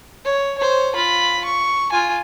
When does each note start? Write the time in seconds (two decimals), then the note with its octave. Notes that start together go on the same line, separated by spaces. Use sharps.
0.25 C#5
0.58 C5 C#5
0.96 F4 B5
1.44 C#6
1.92 F4 G#5